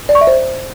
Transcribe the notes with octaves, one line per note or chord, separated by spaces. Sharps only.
D5
C#6
E5
C5